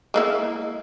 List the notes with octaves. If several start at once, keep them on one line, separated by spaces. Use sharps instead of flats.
G#3 A#3 E4